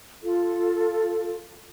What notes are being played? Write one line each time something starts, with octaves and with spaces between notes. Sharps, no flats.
F4 A4